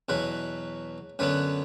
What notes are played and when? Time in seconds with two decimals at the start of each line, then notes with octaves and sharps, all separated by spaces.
0.09 E2 B2 F#3 B4
1.19 F#2 D3 F#3 B3 B4